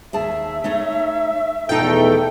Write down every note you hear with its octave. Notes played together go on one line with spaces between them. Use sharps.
D#2 G#4 E5 A5
A3 D#4 C#5
E2 B2 F3 A3 D#4 A4 G5